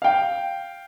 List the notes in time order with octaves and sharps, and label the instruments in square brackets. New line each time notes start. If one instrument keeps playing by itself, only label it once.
[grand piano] F5 G5